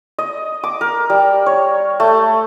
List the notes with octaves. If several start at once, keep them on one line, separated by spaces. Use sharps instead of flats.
D#5
D6
A#4
G3
C#5
A3